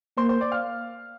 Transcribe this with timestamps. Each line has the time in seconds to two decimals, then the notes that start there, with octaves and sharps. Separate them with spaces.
0.17 A#3 C5 C6
0.29 C5 C6
0.40 D5 D6
0.52 F5 F6